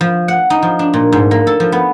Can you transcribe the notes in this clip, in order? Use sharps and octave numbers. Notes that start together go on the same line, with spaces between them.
F3
F#5
D#4
F3
D4
A#2
G#2
A#3
A4
F3
B3